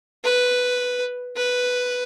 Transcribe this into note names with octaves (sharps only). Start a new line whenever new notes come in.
B4
B4